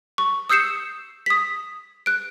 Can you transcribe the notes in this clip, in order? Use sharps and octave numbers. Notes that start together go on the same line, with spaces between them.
C#6
D#6 E6 G6 C7 C#7 E7
D#6 B6
F#6 D7